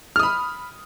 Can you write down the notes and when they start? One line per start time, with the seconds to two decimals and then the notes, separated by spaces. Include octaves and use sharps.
0.16 F6
0.19 D#6
0.23 B5